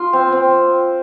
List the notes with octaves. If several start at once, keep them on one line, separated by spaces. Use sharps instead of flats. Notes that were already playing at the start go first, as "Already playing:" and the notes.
Already playing: F4 C6
C4
C4